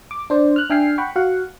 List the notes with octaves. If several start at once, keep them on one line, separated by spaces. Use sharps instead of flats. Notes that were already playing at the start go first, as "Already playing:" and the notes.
D6
D4 C5 D5
F6 F#6
D4 E5 G5 G#5 F6 C7
F#5 G5 B5 C#6
F#4 F5 F#5